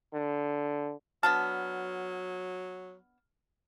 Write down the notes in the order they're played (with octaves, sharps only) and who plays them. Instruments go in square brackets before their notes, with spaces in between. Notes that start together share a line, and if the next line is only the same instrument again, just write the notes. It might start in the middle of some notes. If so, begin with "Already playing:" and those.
[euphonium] D3
[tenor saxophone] F#3 [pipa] B3 D4 A5 [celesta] F6